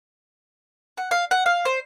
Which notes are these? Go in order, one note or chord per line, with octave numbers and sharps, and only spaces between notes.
F#5
F5
F#5
F5
C5